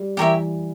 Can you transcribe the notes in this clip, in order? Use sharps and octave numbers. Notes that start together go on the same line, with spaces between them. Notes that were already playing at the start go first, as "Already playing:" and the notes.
Already playing: G3
E3 G4 A#4 C#5 E5